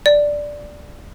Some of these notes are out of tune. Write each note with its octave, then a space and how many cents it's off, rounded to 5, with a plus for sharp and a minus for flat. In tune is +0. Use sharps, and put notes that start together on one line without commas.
D5 +0